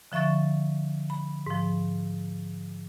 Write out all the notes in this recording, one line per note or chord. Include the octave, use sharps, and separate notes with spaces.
D3 F3 E5 C#6 A6
B5
G#2 F3